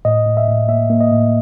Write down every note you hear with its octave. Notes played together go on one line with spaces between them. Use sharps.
A2 D#5
A2
E5
A2
A#3 E5
A#3
D#5
A2